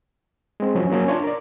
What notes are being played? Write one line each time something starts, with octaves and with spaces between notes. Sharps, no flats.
G#3 C4
F3 F#3 C#4
F#3 A#3 C#4
D4 F4 C#5
A#4 D5